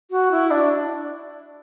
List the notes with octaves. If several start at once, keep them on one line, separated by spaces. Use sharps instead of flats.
F#4
E4
D4